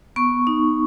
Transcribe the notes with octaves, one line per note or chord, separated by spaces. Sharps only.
B3 C#6
D#4